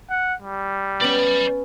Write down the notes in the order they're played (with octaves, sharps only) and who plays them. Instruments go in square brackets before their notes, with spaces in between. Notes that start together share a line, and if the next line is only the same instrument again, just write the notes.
[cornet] F#5
G3
[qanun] B3 C#4 [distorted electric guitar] D5 B5